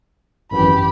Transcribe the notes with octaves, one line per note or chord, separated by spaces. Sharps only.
G#1 F#2 E3 G4 B5